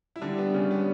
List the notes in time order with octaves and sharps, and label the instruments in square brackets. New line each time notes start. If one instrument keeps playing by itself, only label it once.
[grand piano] E4
[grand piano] D3 D4 [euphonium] G3
[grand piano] B3
C#3 C#4
B3